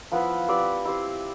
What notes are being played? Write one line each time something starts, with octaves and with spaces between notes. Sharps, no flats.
F3 B3 E4 B4
C4 G4 B4 D5
E4 G4 C5